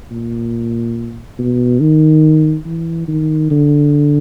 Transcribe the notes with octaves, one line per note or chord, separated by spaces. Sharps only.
A#2
B2
D#3
E3
D#3
D3